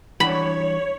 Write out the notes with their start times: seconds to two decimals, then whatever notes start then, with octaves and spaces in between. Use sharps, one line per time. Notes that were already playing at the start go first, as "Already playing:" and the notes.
0.20 E3 G3 D4 C#5 B5